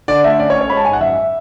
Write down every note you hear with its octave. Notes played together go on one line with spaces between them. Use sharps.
D3 D5
A3 E5
C#4 D5
C#5
C#4
C#5
G#3 B5
A5
G#2 G#5
F#5
F#2 E5